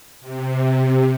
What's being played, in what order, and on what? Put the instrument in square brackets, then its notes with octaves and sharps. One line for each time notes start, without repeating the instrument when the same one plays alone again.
[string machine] C3